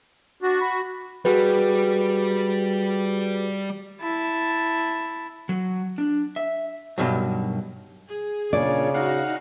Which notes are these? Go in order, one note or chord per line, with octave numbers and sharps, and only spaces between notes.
D4 F#4
B5
G3 F#4 G#4 B4
E4 A5
F#3
D4
E5
G2 B2 D#3 F#3
G#4
A#2 C#3 D4 C#5 D5
D#4 F#4 F5 F#5